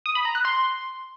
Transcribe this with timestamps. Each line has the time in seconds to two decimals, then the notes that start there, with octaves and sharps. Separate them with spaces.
0.06 D#6
0.15 B5
0.25 A#5
0.35 F#6
0.45 C6